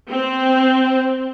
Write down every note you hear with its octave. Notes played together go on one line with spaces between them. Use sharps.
C4